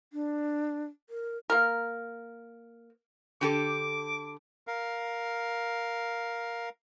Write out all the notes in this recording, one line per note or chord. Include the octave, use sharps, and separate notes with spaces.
D4
A#4
A#3 A#4
D3 G4 A4 D6
A#4 F5